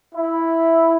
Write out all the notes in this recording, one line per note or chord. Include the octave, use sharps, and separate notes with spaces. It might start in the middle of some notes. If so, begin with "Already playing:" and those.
E4